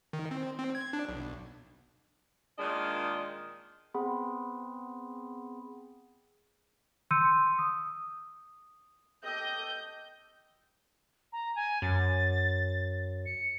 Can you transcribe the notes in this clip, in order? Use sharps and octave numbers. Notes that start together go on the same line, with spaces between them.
D#3
C4
C4
G#6
D4
B1
A#2 D#3 G#3 D4 D#5
B3 C4 G#4 F#5 B5 C6
C6 E6 G6 C#7 D#7
D#6
G4 A4 D#5 G6
A#5
G#5
F#2 A6
C#7